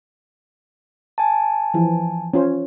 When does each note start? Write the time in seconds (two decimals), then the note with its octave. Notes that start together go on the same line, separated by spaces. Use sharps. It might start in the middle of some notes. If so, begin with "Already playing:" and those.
1.18 G#5 A5
1.74 E3 F3 E4
2.34 C#4 F4 C5